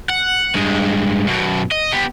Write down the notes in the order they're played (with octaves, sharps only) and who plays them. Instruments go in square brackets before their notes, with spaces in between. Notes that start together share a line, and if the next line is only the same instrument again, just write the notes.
[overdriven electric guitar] F#5
G2 G#3
F#2 B2
D#5
B3 G4